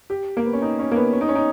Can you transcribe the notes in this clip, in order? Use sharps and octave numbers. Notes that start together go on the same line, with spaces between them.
G4
A#3
B3
C#4
D#4
C#4
A#3
B3
C#4
D#4
C#4
D#4